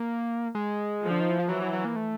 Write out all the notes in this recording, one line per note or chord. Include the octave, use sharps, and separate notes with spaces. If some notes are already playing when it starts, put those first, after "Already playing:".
Already playing: A#3
G#3
F3
D3
D#3
E3
F3
E3 F#3
F#3
F#3
A#3
A3